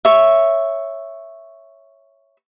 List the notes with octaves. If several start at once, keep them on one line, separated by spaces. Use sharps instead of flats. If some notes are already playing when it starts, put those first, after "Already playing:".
C#5 E5